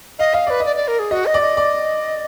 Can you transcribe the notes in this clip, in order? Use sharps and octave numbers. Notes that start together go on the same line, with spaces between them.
D#5 F5
D#5 F5
B4 D5
D#5
D5
D5
A#4
G#4
F#4 D#5
D#5
D5
D#5
D5